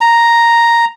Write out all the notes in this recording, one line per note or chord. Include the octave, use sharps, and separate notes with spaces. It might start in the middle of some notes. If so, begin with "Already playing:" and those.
A#5